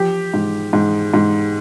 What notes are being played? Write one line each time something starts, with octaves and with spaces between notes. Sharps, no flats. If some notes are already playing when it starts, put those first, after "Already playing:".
Already playing: F3 G4
G#2
G#2
G#2